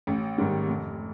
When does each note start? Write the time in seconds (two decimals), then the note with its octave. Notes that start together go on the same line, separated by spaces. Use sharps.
0.07 A1
0.38 G#2 D#3 G3
0.68 F1